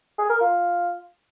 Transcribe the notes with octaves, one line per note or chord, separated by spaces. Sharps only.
G#4
A#4
F4